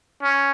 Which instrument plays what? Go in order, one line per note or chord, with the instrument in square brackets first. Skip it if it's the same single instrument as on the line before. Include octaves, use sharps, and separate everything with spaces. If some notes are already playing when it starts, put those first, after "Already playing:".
[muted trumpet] C#4